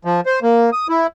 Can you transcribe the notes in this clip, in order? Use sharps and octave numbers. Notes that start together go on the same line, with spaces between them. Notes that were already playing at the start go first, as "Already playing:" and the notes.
F3
C5
A#3
D#6
E4